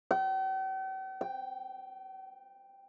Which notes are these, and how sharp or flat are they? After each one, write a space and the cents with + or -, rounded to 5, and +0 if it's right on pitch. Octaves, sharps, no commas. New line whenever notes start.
G5 -45
G5 +5